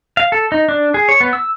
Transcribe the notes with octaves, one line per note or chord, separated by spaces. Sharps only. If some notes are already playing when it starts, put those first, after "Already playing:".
F5
A4
D#4
D4
G#4
C#5
B3
E6